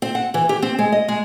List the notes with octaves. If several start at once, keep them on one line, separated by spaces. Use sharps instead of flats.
C4
F#5
E3
G4
C4
G#3
D#5
G#3